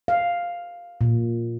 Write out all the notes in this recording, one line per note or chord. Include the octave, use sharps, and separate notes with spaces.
F5
A#2